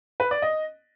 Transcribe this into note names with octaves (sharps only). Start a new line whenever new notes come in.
B4
D5
D#5